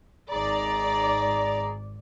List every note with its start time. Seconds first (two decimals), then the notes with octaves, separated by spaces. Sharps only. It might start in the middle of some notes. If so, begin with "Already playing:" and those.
0.31 G#1 D#4 G#4 D5 A#5